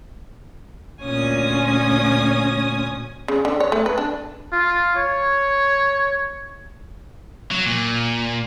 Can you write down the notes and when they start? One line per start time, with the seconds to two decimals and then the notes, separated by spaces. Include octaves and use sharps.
1.03 D2 A#2 C#4 C#5 G#5 D#6
3.28 C#3
3.45 D3
3.60 C#5
3.72 A3
3.86 B4
3.98 D4
4.52 F4
4.96 C#5
7.51 F#3
7.66 A#2